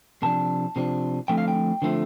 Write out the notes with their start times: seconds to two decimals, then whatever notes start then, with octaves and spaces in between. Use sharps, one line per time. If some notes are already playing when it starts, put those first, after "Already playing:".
0.22 C3 F3 D4 A5
0.76 C3 F3 D4
1.28 D3 F3 A3 C4 G5
1.38 F5
1.48 G5
1.82 D3 F3 A3 C4